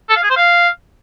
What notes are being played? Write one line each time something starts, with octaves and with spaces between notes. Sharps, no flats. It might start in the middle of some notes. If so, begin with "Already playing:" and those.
A4
F5
G#4
C5
F5